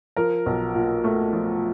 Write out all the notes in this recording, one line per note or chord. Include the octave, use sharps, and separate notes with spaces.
F3 A#4
B1
A#2
A3
F3